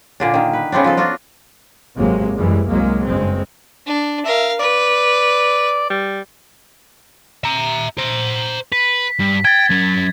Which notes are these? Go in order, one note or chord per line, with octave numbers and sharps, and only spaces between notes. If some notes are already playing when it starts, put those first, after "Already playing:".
A#2 D3 D4
D3 D#3
B4
C#3 B3 C4 D4
F3 D#4 A4
D4 F4 F#4 A4
G#1 C3 F#3 G#3 A#3
F#2 E3 G3 G#3
C2 F#3 G#3 A#3
F#1 G2 G#3 C4
D4
A#4 E5 F5
B4 D5
G3
E5 A#5
C5 A#5
B4 B6
G2
G5 G#6 A6
F#3 C#4